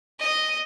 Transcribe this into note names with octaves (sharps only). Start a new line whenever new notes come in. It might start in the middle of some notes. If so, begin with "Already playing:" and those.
D#5